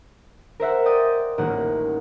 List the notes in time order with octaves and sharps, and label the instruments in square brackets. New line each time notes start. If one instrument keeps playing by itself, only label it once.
[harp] A#4 C5 E5 F#5
D5 D#5 G5 D#6 G6 A6
D#1 A1 D#3 A#3 F#5